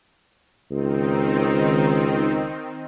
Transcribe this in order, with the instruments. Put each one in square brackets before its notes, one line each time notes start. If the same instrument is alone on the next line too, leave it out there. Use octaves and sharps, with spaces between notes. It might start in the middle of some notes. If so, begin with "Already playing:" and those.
[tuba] C#2 [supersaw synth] D#3 C4 D#4